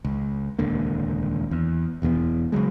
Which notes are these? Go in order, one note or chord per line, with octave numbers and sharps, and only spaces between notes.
C#2
D#1 C#2 D3 A#3
E2
E1 E2 C3 B3
C#3 E3 F#3 G#3